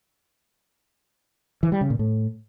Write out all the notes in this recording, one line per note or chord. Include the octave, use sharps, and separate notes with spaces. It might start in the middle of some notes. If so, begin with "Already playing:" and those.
E3
G3
C#3
A#2
A2